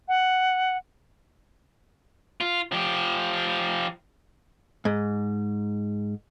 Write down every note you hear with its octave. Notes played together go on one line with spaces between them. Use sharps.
F#5
F4
F3 G4
G#2